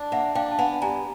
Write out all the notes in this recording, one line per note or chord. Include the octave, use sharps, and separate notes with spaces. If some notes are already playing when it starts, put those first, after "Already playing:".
Already playing: D4
A#3 E5 F#5
D4 F5 G5
A5
B3 F#5 G#5
G2 G#5 A#5